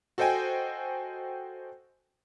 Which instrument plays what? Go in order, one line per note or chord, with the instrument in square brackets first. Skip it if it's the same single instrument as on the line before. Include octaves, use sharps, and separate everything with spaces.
[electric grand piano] F#4 A4 C5 D#5 G5 G#5